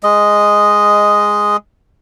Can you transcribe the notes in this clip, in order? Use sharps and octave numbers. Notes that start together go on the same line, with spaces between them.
G#3 D#5